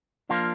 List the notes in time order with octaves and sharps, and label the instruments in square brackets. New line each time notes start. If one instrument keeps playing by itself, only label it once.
[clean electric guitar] F3 A#3 D4 F4